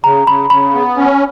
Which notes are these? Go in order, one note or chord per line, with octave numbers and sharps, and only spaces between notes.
C#3 A#5
C#3 B5
C#3 B5
B3
C#4